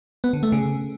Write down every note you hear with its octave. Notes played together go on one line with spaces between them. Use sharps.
B3
D3
A3
C#3